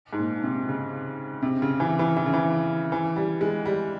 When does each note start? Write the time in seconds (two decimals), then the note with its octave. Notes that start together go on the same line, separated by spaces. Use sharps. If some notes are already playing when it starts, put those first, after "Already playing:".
0.13 G#2
0.19 A#2
0.43 C3
0.69 C#3
1.42 C3
1.62 C#3
1.80 E3
1.99 E3
2.17 E3
2.26 C#3
2.34 E3
2.92 E3
3.16 G3
3.41 G#3
3.65 G3